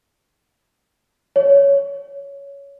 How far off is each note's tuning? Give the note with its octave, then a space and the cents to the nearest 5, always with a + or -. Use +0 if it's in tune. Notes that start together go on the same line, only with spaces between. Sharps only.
C#5 +10